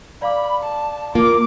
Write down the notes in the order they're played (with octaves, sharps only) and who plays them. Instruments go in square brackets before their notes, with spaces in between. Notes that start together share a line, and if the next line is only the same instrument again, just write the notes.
[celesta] D5 F5 D6 [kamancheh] B5
[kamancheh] A5
[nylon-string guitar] A#3 F4 [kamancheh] D6